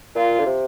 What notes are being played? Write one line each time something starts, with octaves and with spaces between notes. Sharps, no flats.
A#2 F4
D3
C3